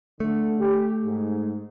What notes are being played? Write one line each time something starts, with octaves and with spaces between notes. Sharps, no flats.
D3 A3
G4
G#2